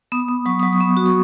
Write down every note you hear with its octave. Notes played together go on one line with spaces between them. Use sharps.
B3 D#6
B3
F#3 C#6
F#3 D#6
C#6
B3
F#4
C#6